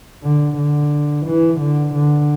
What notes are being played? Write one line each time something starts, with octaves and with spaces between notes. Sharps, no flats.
D3
D3
E3
D3
D3